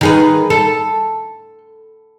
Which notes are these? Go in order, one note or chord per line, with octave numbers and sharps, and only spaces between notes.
D#3 G#4 B4
A4